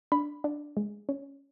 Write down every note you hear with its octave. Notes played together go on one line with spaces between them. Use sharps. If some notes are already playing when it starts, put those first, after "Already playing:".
D4 B5
D4
G#3
C#4